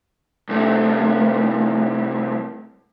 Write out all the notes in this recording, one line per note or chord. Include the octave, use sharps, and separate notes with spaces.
C2 A3